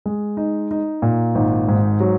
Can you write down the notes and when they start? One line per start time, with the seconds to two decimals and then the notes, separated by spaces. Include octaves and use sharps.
0.06 G#3
0.37 D#4
0.71 D#4
1.02 A#2
1.35 G#1
1.68 G#2
2.00 F#3